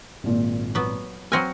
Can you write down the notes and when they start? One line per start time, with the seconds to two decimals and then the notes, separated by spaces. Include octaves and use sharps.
0.24 G#1 A#2
0.75 F#3 B3
1.32 F#3 C4 G#5 F6 A#6 C#7